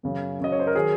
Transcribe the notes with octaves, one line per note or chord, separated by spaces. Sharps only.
F#2 C#3 F#3
F#2 C#3 F#3 D#5
C#5
C5
A#4
D#3 F#3 G#4